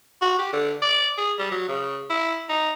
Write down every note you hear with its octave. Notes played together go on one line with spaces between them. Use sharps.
F#4
G4
D3
D5
G#4
G3
F#3
C#3
E4
D#4